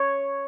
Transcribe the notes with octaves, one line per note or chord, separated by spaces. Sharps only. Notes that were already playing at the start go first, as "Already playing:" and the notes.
Already playing: C#5